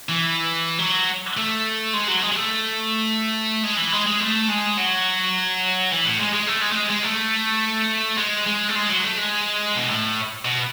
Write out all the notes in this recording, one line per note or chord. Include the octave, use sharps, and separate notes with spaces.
E3
F#3
A3
G#3
F#3
G#3
G#3
A3
G#3
E3
G#3
G#3
A3
G#3
F#3
E3
A2
G#3
G#3
A3
G#3
A3
G#3
G#3
A3
G#3
G#3
A3
G#3
F#3
A3
G#3
B2
A2
B2